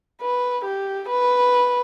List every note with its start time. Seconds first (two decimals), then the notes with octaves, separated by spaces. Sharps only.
0.21 B4
0.65 G4
1.09 B4